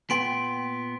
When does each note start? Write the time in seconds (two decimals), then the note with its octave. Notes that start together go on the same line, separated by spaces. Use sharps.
0.10 A#2 B3 G5 C6 D7